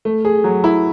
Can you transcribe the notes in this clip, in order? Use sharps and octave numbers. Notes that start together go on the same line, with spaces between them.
A3
G#4
F#3
E4